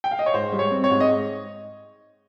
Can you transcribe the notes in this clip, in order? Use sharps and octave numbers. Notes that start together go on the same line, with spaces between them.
G5
F5
D#5
C#5
G#2 C5
G3
C#5
C4
C#5
G#2
D#5